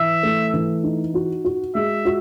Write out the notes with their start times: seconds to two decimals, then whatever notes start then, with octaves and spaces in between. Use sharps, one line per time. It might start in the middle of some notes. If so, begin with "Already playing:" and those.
Already playing: E3 E5
0.23 A3
0.53 E3
0.84 D#4
1.14 F#4
1.44 F#4
1.75 G#3 E5
2.05 F#4